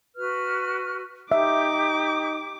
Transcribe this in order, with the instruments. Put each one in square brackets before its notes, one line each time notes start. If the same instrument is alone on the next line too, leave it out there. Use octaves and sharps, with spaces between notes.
[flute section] F#4 B4 F6
[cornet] D#4 [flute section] G4 [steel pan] E5 [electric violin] D6